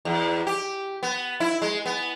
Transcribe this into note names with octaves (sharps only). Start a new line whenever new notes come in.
E2
G4
B3
E4
G#3
B3